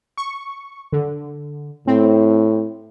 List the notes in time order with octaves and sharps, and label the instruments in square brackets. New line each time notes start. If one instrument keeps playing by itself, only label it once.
[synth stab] C#6
D3
[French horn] A2 [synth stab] C4